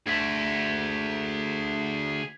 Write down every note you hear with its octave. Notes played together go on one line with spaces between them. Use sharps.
D2 G#4 F#5 G#6 B6 F#7